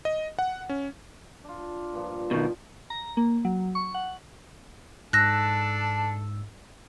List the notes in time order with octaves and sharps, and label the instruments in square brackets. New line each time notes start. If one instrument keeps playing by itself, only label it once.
[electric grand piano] D#5
F#5
C#4
[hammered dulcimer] D4 F4
G2 A#2 F3
[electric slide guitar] B2 D#3
[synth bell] A#5
A#3
F#3
C#6
F#5
[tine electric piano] G#2 E6 [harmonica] D4 A4 [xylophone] F#6 A#6